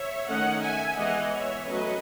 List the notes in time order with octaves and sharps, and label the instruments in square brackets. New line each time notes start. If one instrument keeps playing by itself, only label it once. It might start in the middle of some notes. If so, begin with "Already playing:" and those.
Already playing: [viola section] C#5 E5
D#3 A3 C#4 D#5 F#5
E5 G#5
E3 G#3 B3 D#5 F#5
C#5 E5
F#3 A3 C#4 B4 D#5